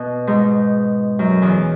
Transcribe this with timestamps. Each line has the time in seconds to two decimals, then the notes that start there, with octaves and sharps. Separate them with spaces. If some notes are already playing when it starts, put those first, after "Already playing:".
Already playing: B2
0.27 G#2
1.19 F#2
1.42 E2